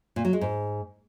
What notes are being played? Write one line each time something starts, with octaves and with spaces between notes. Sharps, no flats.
A#2
F#3
G#3
G#2